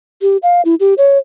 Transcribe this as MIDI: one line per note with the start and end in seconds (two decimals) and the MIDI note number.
0.22 0.37 67
0.43 0.62 77
0.65 0.75 64
0.80 0.94 67
0.98 1.18 73